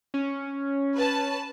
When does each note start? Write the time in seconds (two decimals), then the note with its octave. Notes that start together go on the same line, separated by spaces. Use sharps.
0.14 C#4
0.95 B4 A5